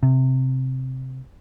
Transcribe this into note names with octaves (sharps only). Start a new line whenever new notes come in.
C3